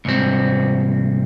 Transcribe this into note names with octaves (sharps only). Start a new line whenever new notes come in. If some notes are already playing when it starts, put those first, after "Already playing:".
C2 G#2 C4